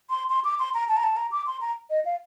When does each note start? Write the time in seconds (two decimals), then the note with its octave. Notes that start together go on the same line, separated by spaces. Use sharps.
0.10 C6
0.30 C6
0.44 D6
0.59 C6
0.74 A#5
0.89 A5
0.97 A#5
1.03 A5
1.17 A#5
1.32 D6
1.47 C6
1.61 A#5
1.90 D#5
2.05 F5